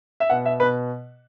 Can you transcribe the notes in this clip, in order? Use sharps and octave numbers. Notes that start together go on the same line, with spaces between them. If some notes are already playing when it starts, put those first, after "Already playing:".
E5
B2 F#5
E5
B2 B4